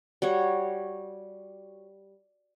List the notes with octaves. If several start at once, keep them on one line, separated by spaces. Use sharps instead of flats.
G3 F#4 C#5